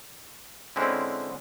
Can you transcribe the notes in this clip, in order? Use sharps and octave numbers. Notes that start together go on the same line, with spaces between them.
D3 G#3 C4 C#4 E4